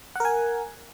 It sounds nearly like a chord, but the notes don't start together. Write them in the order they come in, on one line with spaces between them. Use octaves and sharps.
F#5 A#4 G#5